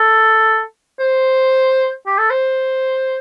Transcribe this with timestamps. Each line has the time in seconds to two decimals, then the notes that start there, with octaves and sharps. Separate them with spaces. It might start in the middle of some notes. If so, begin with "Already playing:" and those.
Already playing: A4
1.00 C5
2.06 G4
2.18 A4
2.30 C5